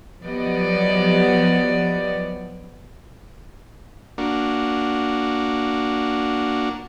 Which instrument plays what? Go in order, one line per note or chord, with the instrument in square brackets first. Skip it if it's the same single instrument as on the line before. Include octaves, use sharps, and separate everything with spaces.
[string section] F3 F#3 B3 G4 D5 D#5
[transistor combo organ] A#3 D4 F#4